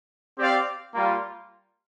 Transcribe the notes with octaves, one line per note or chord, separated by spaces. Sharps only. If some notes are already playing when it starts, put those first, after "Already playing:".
C4 G4 D5 F5
G3 A#3 F4